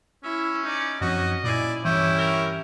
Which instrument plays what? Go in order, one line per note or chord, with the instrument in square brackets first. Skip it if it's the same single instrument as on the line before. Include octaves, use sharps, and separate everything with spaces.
[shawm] C#4 [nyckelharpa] E4 E5
[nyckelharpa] D#4 D5
[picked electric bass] F#2 F3 C4 [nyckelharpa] C#4 D#4 [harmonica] F#4 [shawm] D#5
[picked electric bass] A#2 [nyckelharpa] E4 G#5 [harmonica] D5
[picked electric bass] G2 E3 [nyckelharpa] C#4 G4 [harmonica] E4 C#5 [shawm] G5
[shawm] A#4